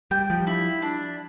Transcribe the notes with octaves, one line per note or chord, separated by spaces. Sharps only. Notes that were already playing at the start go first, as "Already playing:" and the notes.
G3 G5
F3 G3
E4
D4